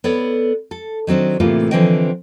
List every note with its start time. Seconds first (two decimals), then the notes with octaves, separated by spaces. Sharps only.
0.04 B3 A4 C#5 D5
0.71 A4
1.07 D#3 F#3 C4 D4
1.40 A2 C3 E3 A3 A#3 F4
1.71 D3 E3 F3 C4 D#5 G5